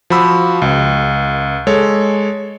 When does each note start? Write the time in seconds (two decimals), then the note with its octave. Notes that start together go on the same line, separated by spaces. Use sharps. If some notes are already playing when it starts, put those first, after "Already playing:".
0.10 F3 F#4 B5 E6
0.62 C#2
1.67 G#3 A4 C#5